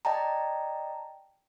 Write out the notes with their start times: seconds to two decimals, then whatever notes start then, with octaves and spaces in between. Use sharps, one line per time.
0.05 D5 D#5 G5 A5 A#5